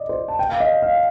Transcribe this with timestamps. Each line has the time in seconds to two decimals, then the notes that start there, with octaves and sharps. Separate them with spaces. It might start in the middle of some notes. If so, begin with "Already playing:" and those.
Already playing: D5 D#5
0.09 C5
0.28 A5
0.39 G5
0.49 F5
0.60 D#5
0.82 F5